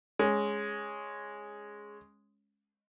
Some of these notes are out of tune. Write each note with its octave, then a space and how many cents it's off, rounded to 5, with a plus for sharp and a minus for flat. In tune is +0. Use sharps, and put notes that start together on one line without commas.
G#3 +0 C#4 +0